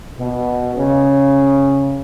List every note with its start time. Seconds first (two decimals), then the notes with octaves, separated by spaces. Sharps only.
0.18 B2
0.75 C#3